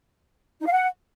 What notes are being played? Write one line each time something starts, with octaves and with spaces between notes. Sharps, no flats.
D#4
F5
F#5